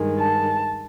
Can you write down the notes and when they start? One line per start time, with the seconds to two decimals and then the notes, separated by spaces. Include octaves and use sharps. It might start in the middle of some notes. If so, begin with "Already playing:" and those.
Already playing: G2 D#3 G#3
0.19 A5